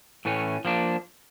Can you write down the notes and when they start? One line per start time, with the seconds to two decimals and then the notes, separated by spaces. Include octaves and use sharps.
0.25 A2 E3 A3 C#4
0.65 F3 A#3 D4